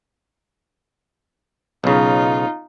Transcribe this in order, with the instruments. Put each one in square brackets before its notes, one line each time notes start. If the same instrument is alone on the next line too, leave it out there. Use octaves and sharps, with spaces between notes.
[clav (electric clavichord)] B1 C#3 [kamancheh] D#4 F4